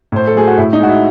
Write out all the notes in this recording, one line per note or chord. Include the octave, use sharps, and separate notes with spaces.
A2 C5
A4
F#3 A3 G#4
F#4
A2 E4
D#4
G#3 F#4
E4